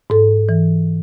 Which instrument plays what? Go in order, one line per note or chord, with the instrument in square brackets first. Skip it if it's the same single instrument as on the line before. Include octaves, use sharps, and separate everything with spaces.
[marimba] G#2 A4
E3